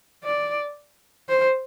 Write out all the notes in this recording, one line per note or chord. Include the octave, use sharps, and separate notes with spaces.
D5
C5